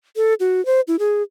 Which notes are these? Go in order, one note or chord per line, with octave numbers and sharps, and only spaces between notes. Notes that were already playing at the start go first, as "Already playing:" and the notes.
A4
F#4
C5
E4
G#4